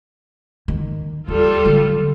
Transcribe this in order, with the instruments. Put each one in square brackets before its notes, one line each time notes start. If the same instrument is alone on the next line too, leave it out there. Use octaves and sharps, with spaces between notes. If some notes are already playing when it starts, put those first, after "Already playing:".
[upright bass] D#3
[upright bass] D#2 [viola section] G3 F4 A4
[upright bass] D3 F#3